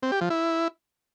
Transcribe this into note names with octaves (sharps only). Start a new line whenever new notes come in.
C4
G4
F3
E4